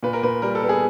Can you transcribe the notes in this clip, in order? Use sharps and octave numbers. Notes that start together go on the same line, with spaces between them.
A#2 B4
A#4
A#2 B4
G3 A#4
A4
B3
G#4